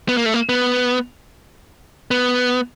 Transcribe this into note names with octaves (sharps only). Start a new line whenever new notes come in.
B3
A#3
A3
A#3
B3
B3